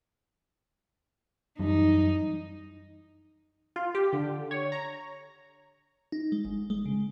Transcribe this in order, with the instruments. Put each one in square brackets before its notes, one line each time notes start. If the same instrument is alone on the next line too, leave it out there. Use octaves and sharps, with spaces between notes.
[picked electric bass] F#2 E3 G3 [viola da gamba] D#4
[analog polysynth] F4
G4
D3
C#5
A#5
[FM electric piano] D#4
G#3
G1
G#3
C#3